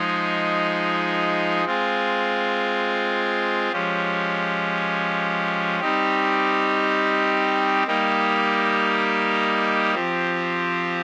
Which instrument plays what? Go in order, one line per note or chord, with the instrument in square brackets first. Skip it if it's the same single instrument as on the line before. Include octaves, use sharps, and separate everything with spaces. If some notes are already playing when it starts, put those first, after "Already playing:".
Already playing: [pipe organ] F3 G#3 D#4 G#4
G#3 C4 F4 G#4
F3 G#3 C#4 G4
G3 C4 D#4 G4
G3 A#3 D#4 G4
F3 C4 G4